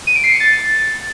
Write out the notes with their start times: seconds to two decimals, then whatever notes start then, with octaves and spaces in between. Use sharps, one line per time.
0.07 D#7
0.15 D7
0.24 C7
0.32 C#7
0.40 A6